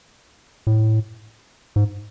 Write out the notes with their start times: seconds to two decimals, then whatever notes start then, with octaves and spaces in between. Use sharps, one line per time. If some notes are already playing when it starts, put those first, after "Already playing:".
0.67 A2
1.76 G#2